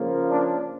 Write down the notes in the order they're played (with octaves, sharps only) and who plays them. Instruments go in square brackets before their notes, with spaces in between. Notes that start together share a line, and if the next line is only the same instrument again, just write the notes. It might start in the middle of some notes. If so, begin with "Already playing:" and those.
Already playing: [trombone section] C#3 F3 A#3
D4